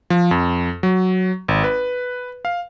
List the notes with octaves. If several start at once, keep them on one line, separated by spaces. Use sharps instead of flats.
F3
F2
F#3
G#1
B4
F5